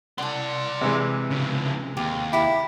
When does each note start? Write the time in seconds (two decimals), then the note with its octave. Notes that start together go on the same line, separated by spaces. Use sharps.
0.18 D5 F#5 A5 C6
0.81 C3 E3 G#3
1.30 C#3 F3
1.97 D#2 G4
2.33 E4 G4 F5 A#5